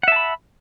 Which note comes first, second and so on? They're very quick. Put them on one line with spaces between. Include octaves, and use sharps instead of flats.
F#5 E5 A5 B5